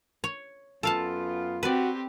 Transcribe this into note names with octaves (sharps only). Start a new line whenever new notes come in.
C#5
F#2 B3 F4 A4 F5 A5
C4 F#4 G4 B4 D5